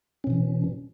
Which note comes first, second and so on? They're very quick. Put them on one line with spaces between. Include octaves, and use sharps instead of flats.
C#4 B2 E3